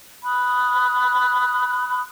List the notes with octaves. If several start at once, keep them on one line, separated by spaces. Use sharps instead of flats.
B5 D#6 F#6